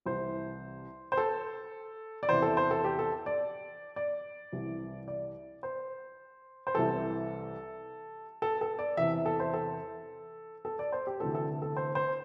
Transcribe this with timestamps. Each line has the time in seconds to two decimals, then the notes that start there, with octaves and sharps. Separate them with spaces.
0.06 C2 C3 E3 C5
1.12 C5
1.17 A4
2.23 D5
2.29 E2 C3 E3 C5
2.42 A4
2.57 C5
2.71 A4
2.85 G4
2.99 A4
3.26 D5
3.96 D5
4.52 C2 C3 E3
5.08 D5
5.63 C5
6.67 C5
6.75 C2 C3 E3 A4
8.42 A4
8.61 A4
8.79 D5
8.97 E2 C3 E3 E5
9.26 A4
9.40 C5
9.54 A4
10.65 A4
10.79 D5
10.92 C5
11.07 G4
11.20 D2 C3 E3 A4
11.35 A4
11.62 A4
11.77 C5
11.95 C5